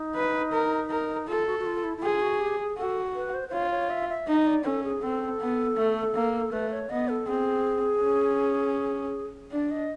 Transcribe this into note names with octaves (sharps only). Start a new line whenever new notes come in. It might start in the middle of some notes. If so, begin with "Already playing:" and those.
Already playing: D#4
B4
A#4
A#4
F4 A4
F#4
F#4
F4
E4
E4
F4 G#4
F#4
G4
G#4
F#4 A4
B4
C5
C5
F4 C#5
C#5
E5
E5
D#4 D#5
D5
C#4 A4
G#4
C4 A4
B3
A3
A#3
A3 B4
C#5
B3 D#5
A4
C4 G#4
C#4
D4 D5
D#5